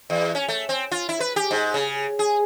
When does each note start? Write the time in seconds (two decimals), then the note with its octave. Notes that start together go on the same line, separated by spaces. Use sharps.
0.10 E2
0.35 C#4
0.48 A3
0.69 C4
0.92 F4
1.09 E4
1.20 B4
1.36 G4
1.51 G#2
1.74 C#3
2.19 G#4